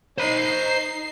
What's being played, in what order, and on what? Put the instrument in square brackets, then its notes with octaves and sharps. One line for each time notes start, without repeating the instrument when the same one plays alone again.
[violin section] D#4 C7 [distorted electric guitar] C5 B5